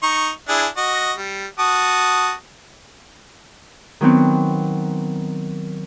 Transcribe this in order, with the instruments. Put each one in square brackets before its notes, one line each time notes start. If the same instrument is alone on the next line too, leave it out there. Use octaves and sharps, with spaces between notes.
[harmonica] D#4 C#6
D4 E4 G#4
F#4 D#5
G3
F#4 A5 D#6
[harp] D#3 F#3 B3 C4 F#4